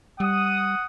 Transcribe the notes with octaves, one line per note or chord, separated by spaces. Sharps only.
G3 F#5 D#6